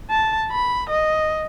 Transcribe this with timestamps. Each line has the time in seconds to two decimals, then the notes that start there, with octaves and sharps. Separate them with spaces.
0.11 A5
0.51 B5
0.89 D#5